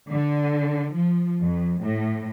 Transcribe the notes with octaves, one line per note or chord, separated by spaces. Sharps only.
D3
F3
F2
A2